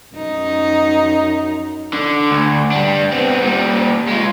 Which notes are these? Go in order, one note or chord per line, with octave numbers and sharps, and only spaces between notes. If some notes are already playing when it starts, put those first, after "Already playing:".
F#2 D#4
D3
D2
G3 D4
B3 C4
A#2 G3
G#3 F4